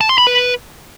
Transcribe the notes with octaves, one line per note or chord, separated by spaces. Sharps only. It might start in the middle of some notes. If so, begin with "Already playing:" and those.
A5
C6
B5
B4